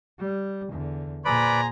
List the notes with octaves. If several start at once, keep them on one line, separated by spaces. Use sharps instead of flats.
G3
E2 D3
A#2 G#4 B4 C5 D5 A#5 B5